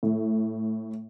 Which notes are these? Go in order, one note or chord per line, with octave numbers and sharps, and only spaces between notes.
A2